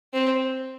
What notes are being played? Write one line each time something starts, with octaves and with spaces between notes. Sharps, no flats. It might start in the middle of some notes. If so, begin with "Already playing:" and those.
C4